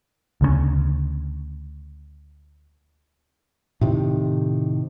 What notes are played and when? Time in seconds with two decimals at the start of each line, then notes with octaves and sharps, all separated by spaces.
0.41 D2 C#3 G#3 C#4
3.81 A2 C3 D#3